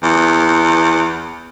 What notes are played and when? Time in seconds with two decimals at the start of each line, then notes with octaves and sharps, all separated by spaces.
0.03 E2